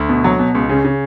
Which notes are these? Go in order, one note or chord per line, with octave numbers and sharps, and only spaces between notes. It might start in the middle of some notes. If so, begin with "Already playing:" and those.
Already playing: D2
B2
F#3
B2
C#2
C#3
C#3